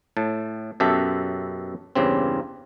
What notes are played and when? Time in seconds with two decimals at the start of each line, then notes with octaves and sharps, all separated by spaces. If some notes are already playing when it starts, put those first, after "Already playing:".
0.17 A2 A5
0.80 F#2 B2 G4 A4 E5
1.95 E2 G2 C#3 C4